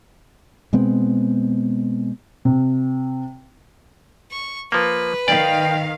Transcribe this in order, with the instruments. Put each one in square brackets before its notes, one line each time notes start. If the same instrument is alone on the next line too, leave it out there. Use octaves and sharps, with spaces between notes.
[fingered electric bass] B2 G#3 B3 C4
[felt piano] C3
[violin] C#6
[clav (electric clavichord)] F3 A#3 [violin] B4
[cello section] D#3 F5 [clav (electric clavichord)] D5 [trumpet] G5